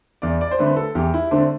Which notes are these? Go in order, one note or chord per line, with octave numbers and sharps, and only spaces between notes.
E2 D5
D5
C5
D3 A3 C4 B4
A4
E2 G4
E4
D3 A3 C4 D4